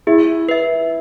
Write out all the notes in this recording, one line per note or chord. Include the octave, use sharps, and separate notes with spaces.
E4 G#4
B4 E5